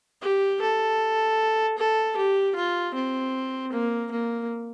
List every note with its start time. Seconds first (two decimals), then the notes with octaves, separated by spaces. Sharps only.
0.21 G4
0.61 A4
1.78 A4
2.17 G4
2.56 F4
2.95 C4
3.72 A#3
4.11 A#3